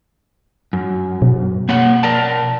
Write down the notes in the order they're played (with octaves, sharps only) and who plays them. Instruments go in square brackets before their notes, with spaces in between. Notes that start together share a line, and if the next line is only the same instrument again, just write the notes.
[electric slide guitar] F#2
[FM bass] B2
[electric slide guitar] A#3 C#5 F#5
A#4 D5 A5